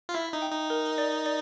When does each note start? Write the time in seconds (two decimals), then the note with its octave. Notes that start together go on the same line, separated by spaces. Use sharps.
0.09 F4
0.14 E4 E5
0.33 D#4
0.42 G5
0.51 D#4
0.70 A#4
0.98 D5
1.26 D5